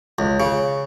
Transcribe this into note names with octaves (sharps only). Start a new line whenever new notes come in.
C#2
C#3